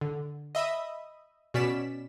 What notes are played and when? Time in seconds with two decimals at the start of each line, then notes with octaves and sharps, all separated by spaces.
0.01 D3
0.55 D#5 E5 B5 D#6
1.54 B2 C#4 D5 B6 E7